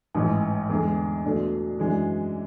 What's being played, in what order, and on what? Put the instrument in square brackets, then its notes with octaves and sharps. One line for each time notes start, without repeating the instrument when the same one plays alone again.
[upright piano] A1 G#2 E3
E2 D3 G#3
E2 B2 A3 D4
F#2 E3 G#3 D4